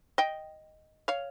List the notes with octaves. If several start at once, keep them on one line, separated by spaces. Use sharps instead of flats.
D#5 G5
C#5 F5